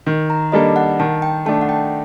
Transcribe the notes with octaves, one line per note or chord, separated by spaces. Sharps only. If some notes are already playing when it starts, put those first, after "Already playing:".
D#3
A#5
G3 A#3 D4 A4 D#5
F#5
D#3 A5
G5
A3 D4 A5
F#5
G5